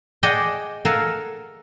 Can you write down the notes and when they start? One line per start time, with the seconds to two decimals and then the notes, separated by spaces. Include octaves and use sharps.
0.23 G#4 D5 D#5 F#5 G5 A5
0.85 A4 A#4 F5 F#5 G#5 A5